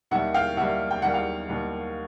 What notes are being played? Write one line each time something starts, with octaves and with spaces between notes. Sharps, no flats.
D#2 D#3 G3 E5 F#5
F5 G5
D#2 D#3 G3 E5 F#5
G5
D#2 D#3 G3 F#5
F5 G5
D#2 D#3 G3